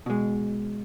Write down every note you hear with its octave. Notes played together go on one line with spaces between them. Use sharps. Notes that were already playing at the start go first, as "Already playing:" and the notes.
B2 G#3